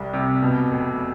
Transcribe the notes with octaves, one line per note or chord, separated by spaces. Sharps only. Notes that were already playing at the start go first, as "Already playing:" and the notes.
Already playing: C2 G3
C3
B2
F1